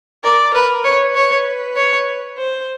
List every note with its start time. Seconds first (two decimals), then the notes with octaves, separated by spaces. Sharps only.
0.24 A#4 D5
0.54 A#4 B4
0.84 B4 C#5
1.15 C#5
1.76 C#5
2.37 C5